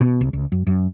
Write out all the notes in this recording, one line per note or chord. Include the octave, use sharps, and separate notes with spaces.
B2
C2
C#2
F#2
F#2